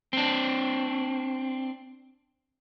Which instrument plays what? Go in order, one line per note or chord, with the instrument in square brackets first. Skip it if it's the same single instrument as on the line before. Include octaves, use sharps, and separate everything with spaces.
[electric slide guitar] C4 D4